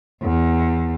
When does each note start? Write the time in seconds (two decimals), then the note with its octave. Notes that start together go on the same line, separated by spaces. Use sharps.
0.23 E2